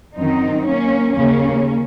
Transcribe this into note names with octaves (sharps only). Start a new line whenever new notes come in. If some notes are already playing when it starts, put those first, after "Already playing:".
F#2 D#3 C4 D#4
A#3 C#4
D#2 C#3 A#3 C#4